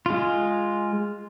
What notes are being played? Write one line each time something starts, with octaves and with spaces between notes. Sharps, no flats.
G#3 F4